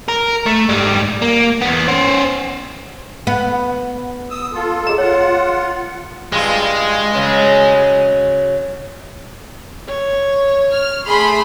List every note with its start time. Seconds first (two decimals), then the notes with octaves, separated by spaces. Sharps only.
0.08 A#4
0.46 A3
0.69 G#2 G3
1.22 A#3
1.61 E2 B3
1.88 C#4 C5
3.27 B3
4.30 D#6 E6
4.53 F4 A4
4.87 G#4 A#5
4.98 F4 C#5 F#5
6.32 G2 G#3 F4
7.14 C#3 F#3
9.88 C#5
10.74 F6
11.07 A3 G#4 B5 C6